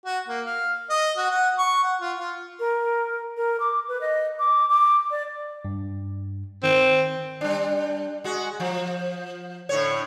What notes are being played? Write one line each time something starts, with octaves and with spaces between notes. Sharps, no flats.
F#4
A#3
F5
D#5
F#4
F#5
C#6
F#5
F4
F4
A#4
A#4
D6
B4
D#5
D6
D6
D5
G2
D#3 C4
G3 D4
G#3 F#4
F3
A2 D3 C#5